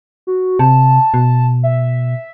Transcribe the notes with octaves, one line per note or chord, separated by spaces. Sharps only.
F#4
C3 A5
B2
E5